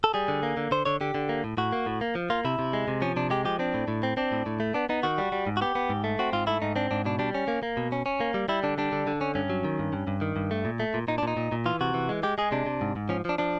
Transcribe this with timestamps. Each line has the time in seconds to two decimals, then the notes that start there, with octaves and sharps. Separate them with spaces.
0.04 A4
0.14 G3 G#4
0.28 D3
0.43 A#3
0.57 D3
0.71 D3 C5
0.85 D3 C#5
1.01 D3 G4
1.15 D3
1.29 A#3
1.44 A2
1.57 A2 F#4
1.72 A#3
1.86 A2
2.01 A#3
2.15 F3
2.30 A#3 F4
2.45 C3 E4
2.59 C3
2.73 G#3
2.88 C3
3.02 F3 C#4
3.16 C3 D4
3.30 G#3 G4
3.45 F3 G4
3.59 C4 D4
3.74 A2
3.88 A2
4.03 C4
4.17 C4 D4
4.32 A2
4.46 A2
4.60 A3
4.74 B3 D4
4.89 B3 D#4
5.03 D#3 F#4
5.18 G3
5.32 G3
5.47 G#2
5.57 F#4
5.61 B3 G4
5.75 B3
5.89 G#2
6.04 A3
6.19 C4 F#4
6.33 G#2 F4
6.47 A3 E4
6.62 G#2 D#4
6.76 C4 D4
6.91 G#2 D4
7.05 B2 D4
7.19 G3 D4
7.34 C#4
7.48 A#3
7.63 A#3
7.77 B2
7.92 C#4
8.06 C#4
8.20 A#3
8.34 G3
8.48 G3 E4
8.63 D3 D4
8.78 G3 D4
8.92 D3
9.07 D3
9.21 C#4
9.35 G2 C#4
9.50 F#3
9.64 D#3
9.79 G2
9.93 G2
10.07 G2
10.21 D#3
10.36 G2
10.51 A3
10.65 A#2
10.80 A3
10.94 A#2
11.08 A#2 D#4
11.18 D4
11.23 A#2 D#4
11.37 A#2
11.52 A#2
11.66 E3 F4
11.81 C3 F#4
11.94 E3
12.09 G#3
12.23 G#3 G4
12.38 G#3 G#4
12.52 C3 D4
12.66 C3
12.81 G#2
12.96 G#2
13.09 F3 C#4
13.25 F3 D4
13.38 F3 D4